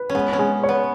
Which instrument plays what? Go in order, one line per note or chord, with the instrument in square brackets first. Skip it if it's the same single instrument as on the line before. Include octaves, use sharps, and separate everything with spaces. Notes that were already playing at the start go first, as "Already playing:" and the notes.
Already playing: [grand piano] B4
[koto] C#4
[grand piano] G#3 [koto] B3
[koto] C#4
[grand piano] G#3
C#5
[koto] B3